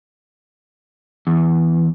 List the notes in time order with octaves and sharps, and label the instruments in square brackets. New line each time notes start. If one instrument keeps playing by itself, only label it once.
[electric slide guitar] E2